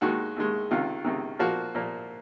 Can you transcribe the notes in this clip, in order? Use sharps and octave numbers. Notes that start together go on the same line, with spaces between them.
D#2 D#3 G#3 F#4
D#2 D#3 G#3
C#2 C3 D#3 F4
C#2 C3 D#3
A#2 F3 A#3 F#4
A#2 F3 A#3